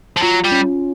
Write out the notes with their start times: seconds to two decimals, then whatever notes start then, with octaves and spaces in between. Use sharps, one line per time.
0.17 F3
0.22 F#3 F4
0.44 G3
0.52 C#4